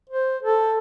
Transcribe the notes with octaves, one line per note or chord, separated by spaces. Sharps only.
C5
A4